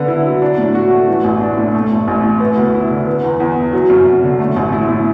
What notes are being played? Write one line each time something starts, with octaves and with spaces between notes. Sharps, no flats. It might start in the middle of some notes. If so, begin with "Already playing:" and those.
Already playing: D3 B3
E4
F#3
D4
A2
F#4
A3
E3
A1
D4
A2
A3
A1
A1
A2
B3
D2
E4
D3
B3
E2
E2
E3
F#3
F#2
F#2
D3
A3
A1
E4
A2